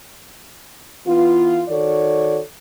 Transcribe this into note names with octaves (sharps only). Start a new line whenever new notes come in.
E3 B3 F4
D#3 F#4 A4 C#5 D5